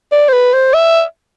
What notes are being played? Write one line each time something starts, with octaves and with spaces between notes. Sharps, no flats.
D5
C5
B4
C5
E5